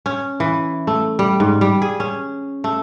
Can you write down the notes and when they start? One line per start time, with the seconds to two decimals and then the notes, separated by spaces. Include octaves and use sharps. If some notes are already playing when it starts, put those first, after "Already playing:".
0.06 C#4
0.40 E3
0.87 A3
1.19 G3
1.40 G#2
1.61 G3
1.82 G#4
2.00 C#4
2.64 A3